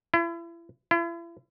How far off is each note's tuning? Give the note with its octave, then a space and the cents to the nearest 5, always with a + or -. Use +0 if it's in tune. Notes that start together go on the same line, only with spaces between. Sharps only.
E4 +35
E4 +40